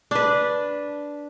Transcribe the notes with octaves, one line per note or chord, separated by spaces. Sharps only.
D4 B4